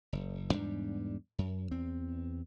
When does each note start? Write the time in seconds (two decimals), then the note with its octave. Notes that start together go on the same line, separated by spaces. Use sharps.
0.13 F#1
0.50 E2 G#2 G3 D4
1.38 F#2
1.71 E2 C4